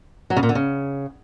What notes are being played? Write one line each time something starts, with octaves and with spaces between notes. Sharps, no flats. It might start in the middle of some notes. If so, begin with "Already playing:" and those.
F#3
C#3
A#2
D3
C#3